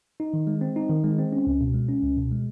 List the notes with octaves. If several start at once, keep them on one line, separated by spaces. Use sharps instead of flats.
D#4
D#3
G#3
C4
D#4
D#3
G#3
C4
C#4
C#2
B2
G#3
C#4
C#2
B2
G#3